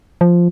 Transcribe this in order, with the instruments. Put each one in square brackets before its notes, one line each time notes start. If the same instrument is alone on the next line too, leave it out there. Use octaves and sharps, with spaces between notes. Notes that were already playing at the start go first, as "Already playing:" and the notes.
[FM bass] F3